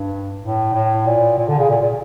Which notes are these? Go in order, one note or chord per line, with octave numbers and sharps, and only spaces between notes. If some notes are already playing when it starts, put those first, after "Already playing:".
Already playing: G2
A2
A2
A#2
A#2
D3
C#3
A#2
A#2